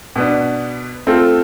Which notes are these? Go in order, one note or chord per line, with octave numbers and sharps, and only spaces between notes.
B2 B3 D4
A3 C4 F4 A4